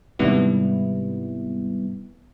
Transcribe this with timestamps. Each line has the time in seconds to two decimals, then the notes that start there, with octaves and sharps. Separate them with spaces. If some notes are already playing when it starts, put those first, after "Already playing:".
0.19 G#2 C3 D#3 G3 B3 E4